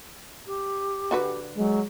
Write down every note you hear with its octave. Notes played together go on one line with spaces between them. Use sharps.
G4
D3 F#4 B4
F#3 G#3